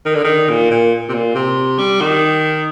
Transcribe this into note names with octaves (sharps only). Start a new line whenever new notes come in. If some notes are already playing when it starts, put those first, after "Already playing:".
D#3
D3
D#3
A#2
A#2
C3
A#2
C3
G3
D#3